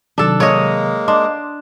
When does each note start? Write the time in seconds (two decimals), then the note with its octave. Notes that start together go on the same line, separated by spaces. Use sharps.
0.18 C3 D#3 F#3 D4 A4
0.40 G#3 A#3 C#5 D#5
1.08 D4 D#5 C6 D6